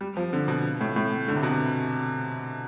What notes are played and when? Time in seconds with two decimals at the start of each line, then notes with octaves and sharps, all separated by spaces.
0.01 G3
0.17 F3
0.33 D3
0.48 B2
0.81 A2
0.96 A2
1.28 D3
1.36 C3
1.43 B2
1.51 C3